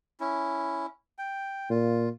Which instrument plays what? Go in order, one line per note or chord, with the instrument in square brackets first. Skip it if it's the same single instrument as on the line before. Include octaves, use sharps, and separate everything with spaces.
[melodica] C#4 E4
G5
[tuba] A#2 [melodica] F4